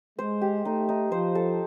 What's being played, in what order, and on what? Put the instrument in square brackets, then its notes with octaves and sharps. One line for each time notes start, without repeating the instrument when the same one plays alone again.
[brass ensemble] G#3 [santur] C5
[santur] G4
[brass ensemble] A3 [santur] D#4
[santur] D#4
[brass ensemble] F3 [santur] C5
[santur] A4